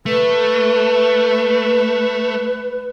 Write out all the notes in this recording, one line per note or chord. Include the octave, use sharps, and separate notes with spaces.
A3 B4